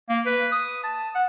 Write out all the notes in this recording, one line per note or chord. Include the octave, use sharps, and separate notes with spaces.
A#3
B4
D#6
A5
F#5